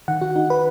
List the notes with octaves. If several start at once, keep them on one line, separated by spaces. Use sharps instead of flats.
D#3 F#5
F#4
D#4
B4